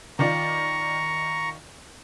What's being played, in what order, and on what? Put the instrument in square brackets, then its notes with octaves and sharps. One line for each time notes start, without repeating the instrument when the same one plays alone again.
[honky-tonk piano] D#3 F4 D5 [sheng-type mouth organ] A#5 C#6